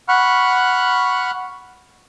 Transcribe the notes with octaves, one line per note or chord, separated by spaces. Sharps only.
F#5 B5 C#6 F6 F#6